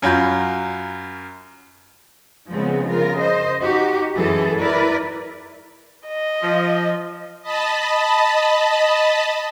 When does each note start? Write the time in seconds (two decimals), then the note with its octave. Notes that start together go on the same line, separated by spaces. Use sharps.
0.02 F#2 F#3 F4 B5 G6
2.50 C#3 F3 G#3 B3 C4
2.86 C#3 F4 A#4
3.18 C5 D#5
3.61 D#4 F#4 G4
4.15 F#2 E3 G#4 A4
4.59 E4 A#4 B4 D5
6.07 D#5
6.43 F3
7.42 D#5 A5 B5